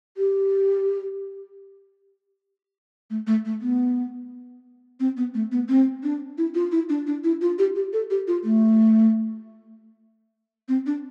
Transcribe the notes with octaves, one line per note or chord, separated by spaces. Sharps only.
G4
A3
A3
A3
B3
C4
B3
A3
B3
C4
D4
E4
F4
E4
D4
D4
E4
F4
G4
G4
A4
G4
F4
A3
C4
D4